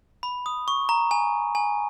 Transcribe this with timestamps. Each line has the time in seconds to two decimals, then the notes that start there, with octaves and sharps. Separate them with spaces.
0.23 B5
0.46 D#6
0.68 C#6
0.89 A#5
1.11 G#5
1.55 G#5